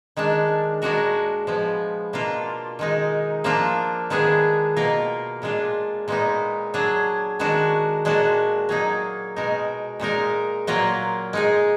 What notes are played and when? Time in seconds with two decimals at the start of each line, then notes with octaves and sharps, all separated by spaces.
0.17 D#3 G#3 D4
0.82 A#2 G#3 D4 F#4 A#4
1.47 F3 G#3 B3
2.13 B2 A#3 D4 F4
2.79 D#3 G#3 D#4
3.44 F3 A#3 D4 F4
4.10 D#3 G#3 B3 D4 G#4
4.76 B2 A#3 F4 A#4
5.42 A#2 G#3 D4 F4
6.08 A#2 G#3 B3 D#4
6.74 F#3 D4 G#4
7.39 D#3 G#3 D4 F#4
8.05 A#2 G#3 D4 F#4
8.69 F#3 A#3 D#4 G#4
9.36 B2 G#3 D#4 A#4
10.00 A#2 G#3 D#4 A#4
10.67 A#2 F#3 A#3 F4 A#4
11.33 G#3 D#4 G#4